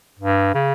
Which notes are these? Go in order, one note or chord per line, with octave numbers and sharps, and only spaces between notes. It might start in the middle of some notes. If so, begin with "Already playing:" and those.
G2
C#3